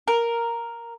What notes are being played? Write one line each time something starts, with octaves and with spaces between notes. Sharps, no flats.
A#4